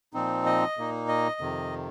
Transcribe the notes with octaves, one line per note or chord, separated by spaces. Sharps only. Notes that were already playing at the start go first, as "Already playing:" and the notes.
A#2 F3 C4 D#4
D#5
A#2 A#3 D#4
D#5
F2 C3 D#3